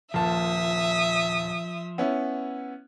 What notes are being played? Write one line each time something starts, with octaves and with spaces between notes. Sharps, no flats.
D#1 A#2 F3 E5 A5 D#6
B3 C#4 E4